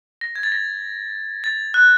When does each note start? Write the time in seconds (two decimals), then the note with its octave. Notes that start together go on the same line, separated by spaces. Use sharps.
0.21 A#6
0.35 G#6
0.43 A6
0.52 A#6
1.44 A6
1.74 F#6